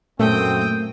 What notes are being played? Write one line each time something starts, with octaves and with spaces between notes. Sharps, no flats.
F#2 A#2 A3 A#3 C4 G5 D#6